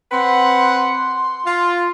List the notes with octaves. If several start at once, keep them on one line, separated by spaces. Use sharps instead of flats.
C4 B4 F#5 C6
F4